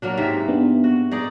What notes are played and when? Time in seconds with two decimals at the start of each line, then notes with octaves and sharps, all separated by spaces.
0.02 F#3 A#3 D4
0.17 G#2 C3 E5
0.48 B3 D4
0.84 F#4
1.11 D#4 G#4 D5